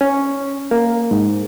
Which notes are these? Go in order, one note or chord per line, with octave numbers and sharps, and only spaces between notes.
C#4
A#3
G#2